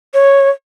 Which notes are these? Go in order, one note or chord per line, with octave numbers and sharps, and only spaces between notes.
C#5